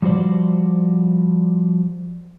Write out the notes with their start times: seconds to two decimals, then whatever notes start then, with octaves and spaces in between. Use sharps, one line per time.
0.02 F3 G3 F#4 C5 D5